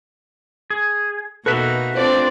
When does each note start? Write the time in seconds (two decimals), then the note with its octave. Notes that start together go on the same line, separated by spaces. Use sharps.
0.70 G#4
1.46 B2 A#3 D#4 F#4 A4 B4 E5 F#6
1.95 C4 D4 F4 C5 D5